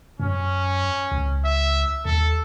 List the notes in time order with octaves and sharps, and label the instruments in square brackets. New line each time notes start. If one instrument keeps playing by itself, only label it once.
[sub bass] F#2 [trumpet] C#4
[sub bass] C#2
[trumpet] E5
[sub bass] D#2 [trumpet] A4